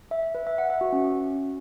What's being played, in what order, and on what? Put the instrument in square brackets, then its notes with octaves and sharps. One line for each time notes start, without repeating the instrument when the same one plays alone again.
[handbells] E5
E5
B4
E5
F#5
E5
F#4
C#4
C#4